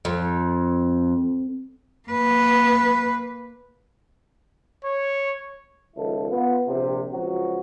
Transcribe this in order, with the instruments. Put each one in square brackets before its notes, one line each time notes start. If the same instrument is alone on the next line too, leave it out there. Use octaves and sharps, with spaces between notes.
[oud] F2
[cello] A#3 B4
[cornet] C#5
[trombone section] C#2 D#3 F3 E4 A4
B3 F4
A#1 C3
C#2 F3 F#3 F#4